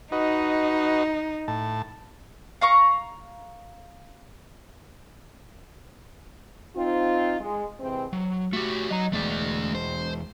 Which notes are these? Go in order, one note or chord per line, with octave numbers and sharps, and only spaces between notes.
D#4 F#4 B4 D#5
A2 A5
F5 A#5 C#6
C4 D#4 F4
G#3
C3 E3 G#3 C4
F#3
A3 F#4 G4
F#3 D#5 A#5
E2 G#3 A3 D5
C5